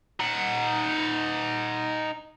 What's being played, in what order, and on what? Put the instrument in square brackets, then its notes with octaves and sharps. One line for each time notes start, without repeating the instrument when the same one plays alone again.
[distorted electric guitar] D#4 F#5